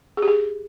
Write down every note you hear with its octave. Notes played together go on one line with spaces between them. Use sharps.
G#4
G4
G#4